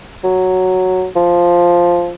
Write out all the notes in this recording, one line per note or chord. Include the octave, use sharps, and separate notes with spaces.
F#3
F3